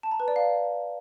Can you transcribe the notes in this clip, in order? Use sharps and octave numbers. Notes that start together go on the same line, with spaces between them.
A5
A#5
B4
D5
F5